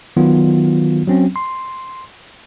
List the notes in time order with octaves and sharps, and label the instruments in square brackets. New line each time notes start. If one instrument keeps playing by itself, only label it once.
[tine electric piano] D#3 F#3 B3 F4
F#3 C4 C#4
C6